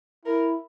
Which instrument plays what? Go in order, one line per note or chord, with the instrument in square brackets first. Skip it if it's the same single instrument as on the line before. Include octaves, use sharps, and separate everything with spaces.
[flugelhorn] E4 [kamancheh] A#4